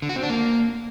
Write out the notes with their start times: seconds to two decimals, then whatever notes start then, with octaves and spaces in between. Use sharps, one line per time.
0.02 D3
0.09 F#4
0.16 C4
0.23 D4
0.30 A#3